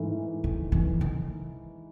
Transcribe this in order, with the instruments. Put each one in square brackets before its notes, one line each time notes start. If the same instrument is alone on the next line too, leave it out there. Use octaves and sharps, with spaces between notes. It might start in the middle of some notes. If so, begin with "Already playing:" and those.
Already playing: [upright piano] G#2 E3 A3
[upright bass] D#3
E3
D#3